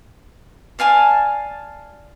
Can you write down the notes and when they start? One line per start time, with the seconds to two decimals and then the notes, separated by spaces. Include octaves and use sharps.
0.79 D5 F5 G#5 A5